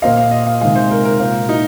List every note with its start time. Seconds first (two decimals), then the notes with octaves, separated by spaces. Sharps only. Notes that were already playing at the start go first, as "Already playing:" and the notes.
0.02 A#2 A#3 F4 C5 D#5 F5
0.17 F5
0.31 D#5
0.46 F5
0.61 C3 D#3 G#3 F5
0.75 C5
0.91 A#4
1.05 A#4
1.20 A#2 A#3 F4 C5 F5
1.49 D#4